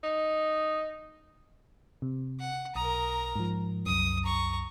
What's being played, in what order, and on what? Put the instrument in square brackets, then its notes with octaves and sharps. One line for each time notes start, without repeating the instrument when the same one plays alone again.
[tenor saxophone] D#4
[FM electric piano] C3
[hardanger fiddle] F#5
[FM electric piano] B1 D#6 [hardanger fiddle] A#4 A#5
[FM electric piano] G#2 F3
[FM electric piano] C2 F#2 [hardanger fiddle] D#6
[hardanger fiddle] A#5 C#6